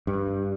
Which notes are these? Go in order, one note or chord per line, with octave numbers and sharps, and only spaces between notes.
G2